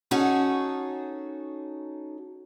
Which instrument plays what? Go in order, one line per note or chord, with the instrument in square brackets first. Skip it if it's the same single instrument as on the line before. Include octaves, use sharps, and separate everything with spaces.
[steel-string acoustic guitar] C#4 D#4 F#4 G#4 A4